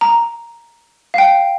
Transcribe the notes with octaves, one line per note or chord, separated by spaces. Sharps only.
A#5
F5
G5